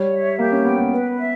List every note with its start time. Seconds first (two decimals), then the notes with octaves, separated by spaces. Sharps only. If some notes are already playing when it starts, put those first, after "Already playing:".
Already playing: G3 C#5
0.13 E5
0.39 A#3 G4
0.52 C#4
0.65 B3 G5
0.78 B3
0.91 B4
1.17 E5